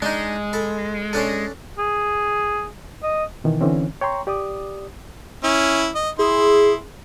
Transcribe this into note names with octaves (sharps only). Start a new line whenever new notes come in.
G#3 D4 D#4
A4 B5
C#4 D4 A4
G#4
D#5
B2 D#3 E3
D3 E3 C4 C#4
C#5 G5 A#5 C6 C#6
G4 D5 D6 D#6
C#4 E4
D#5
E4 G#4 C6